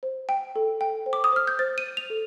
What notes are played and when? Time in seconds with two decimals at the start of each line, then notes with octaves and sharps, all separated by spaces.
0.03 C5
0.29 G5
0.56 A4
0.81 G5
1.06 C5
1.13 D6
1.24 D#6
1.32 C5 F6
1.47 G6
1.59 C5 A6
1.78 D#7
1.84 C5
1.97 F7
2.10 A4